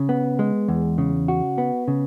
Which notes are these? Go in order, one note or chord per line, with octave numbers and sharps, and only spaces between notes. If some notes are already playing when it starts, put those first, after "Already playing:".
Already playing: C#3
B3
G#3
E2
C#3
F#4
B3
C#3